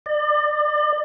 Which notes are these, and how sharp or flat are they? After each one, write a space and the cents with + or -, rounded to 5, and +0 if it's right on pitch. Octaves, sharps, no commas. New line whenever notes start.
D5 +35